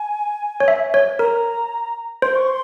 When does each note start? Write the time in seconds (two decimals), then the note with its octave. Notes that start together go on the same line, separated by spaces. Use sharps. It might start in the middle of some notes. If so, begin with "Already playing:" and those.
Already playing: G#5
0.60 C#5
0.68 E5
0.94 C#5
1.19 A#4 A#5
2.22 C5 C6
2.35 C#6
2.48 C6